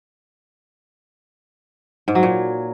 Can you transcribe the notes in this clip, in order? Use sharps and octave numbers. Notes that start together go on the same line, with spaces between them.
G#2
F#3
A#2